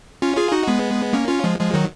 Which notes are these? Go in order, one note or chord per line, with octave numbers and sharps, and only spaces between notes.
C#4 F4
F4 G#4
D#4 F#4
G#3 B3
A#3 C#4
C#4 F4
F3 G#3
F3 G#3
D#3 F#3